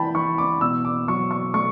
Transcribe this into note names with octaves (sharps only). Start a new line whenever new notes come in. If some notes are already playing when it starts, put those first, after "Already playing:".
Already playing: E3 G5 A5 B5
E3 C#6
D6
B2 E6
D6
F#3 C#6
C#6
A3 C#6